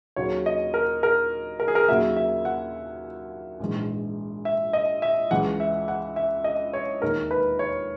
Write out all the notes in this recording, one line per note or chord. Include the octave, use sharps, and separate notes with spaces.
D#2 C#3 F#3 A#3 C#5
D#5
A#4
A#4
A#4
G#4
A#4
D#2 C#3 F#3 A#3 E5
E5
F#5
A#1 G#2 E3
E5
D#5
E5
C#2 C#3 E3 F#5
E5
F#5
E5
D#5
C#5
E1 D#2 D#3 A#4
B4
C#5